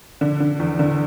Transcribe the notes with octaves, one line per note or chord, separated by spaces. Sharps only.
D3
D3
E2
D3